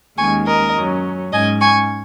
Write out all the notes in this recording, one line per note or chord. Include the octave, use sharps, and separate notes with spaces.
D#2 D#3 G#3 C#4 G#5 C#6
A#4 D#5
F#2 F#3 C#4
G#2 G#3 C#4 D#5 G#5
G#5 C#6